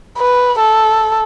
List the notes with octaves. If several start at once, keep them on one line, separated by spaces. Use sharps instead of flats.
B4
A4